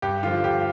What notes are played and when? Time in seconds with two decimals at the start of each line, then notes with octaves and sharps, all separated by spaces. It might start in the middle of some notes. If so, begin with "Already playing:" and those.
0.02 G2 G4
0.23 D3 F3 F4
0.44 G2 G4